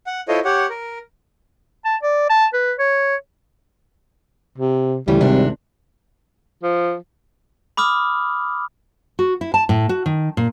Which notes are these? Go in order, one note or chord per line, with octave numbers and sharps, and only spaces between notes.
F#5
E4 F4 A4 C5 C#5 D#5
G4 C#5 F#5
A#4
A5
D5
A5
B4
C#5
C3
D2 A2 C#3 E3 G3
G#1 C3 D4
F3
B5 D6 D#6 F6
F#4
E4
A5
A2
F#4
D#3
A#2